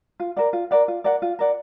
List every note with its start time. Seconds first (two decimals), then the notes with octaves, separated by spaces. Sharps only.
0.20 F4
0.36 A#4 D5 F#5
0.53 F4
0.71 A#4 D5 F#5
0.88 F4
1.04 A#4 D5 F#5
1.22 F4
1.39 A#4 D5 F#5